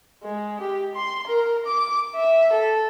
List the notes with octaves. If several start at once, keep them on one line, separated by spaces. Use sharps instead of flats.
G#3
G4
C6
A#4
D6
E5
A4